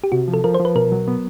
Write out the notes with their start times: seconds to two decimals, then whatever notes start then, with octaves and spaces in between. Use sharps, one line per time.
0.04 G4
0.12 C3 F#4
0.28 F3
0.34 A4
0.44 F3 A#4
0.54 C5
0.60 F3 B4
0.75 B2 A#4
0.92 F#3
1.08 B3